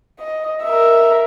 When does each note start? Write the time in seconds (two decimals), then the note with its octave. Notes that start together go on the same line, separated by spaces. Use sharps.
0.20 D#5
0.64 A#4 E5